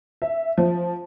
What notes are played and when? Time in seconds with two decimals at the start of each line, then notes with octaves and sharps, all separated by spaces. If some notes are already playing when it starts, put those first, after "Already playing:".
0.22 E5
0.58 F3